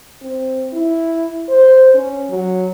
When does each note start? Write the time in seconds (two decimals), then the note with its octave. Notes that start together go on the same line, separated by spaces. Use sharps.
0.21 C4
0.73 E4
1.49 C5
1.94 C#4
2.29 F#3